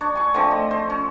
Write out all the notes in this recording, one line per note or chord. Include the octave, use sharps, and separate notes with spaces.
D4 C#5
G#5 C#6
D3 F3 A3 C4
D#5
C5
C#4